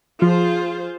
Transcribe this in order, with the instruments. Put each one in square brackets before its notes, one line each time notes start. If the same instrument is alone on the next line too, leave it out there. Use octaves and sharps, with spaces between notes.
[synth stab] F3 [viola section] F4 G#4 C5